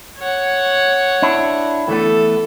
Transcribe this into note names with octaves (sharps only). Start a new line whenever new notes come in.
C#5 F#5
D4 E4
E3 A3 B3 A4